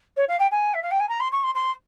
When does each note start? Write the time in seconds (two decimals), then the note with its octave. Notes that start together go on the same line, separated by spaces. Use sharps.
0.17 C#5
0.28 F5
0.39 G5
0.51 G#5
0.74 E5
0.82 F5
0.91 G5
1.00 G#5
1.09 A#5
1.20 C6
1.32 C#6
1.43 C6
1.55 C6